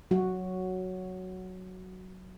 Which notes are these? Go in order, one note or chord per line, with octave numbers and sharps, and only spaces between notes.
F#3 F#4